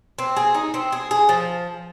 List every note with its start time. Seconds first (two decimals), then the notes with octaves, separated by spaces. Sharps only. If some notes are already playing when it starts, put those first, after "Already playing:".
0.19 C4
0.37 G#4
0.55 D#4
0.74 C4
0.92 G#4
1.11 G#4
1.29 F3